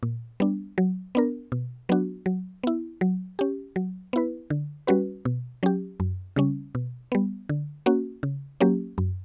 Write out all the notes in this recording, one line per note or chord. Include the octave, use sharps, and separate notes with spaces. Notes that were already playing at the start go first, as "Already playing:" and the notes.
A#2
G3 B3 D4
F#3
B3 D4 A#4
B2
F#3 B3 D4 F#4
F#3
B3 E4
F#3
C#4 G4
F#3
B3 E4 B4
D3
G3 C#4 F#4 B4
B2
F#3 C#4 G4
F#2
C#3 G3 C#4
B2
G3 B3
D3
A#3 C#4 F#4
C#3
F#3 A#3 C#4 G4
F#2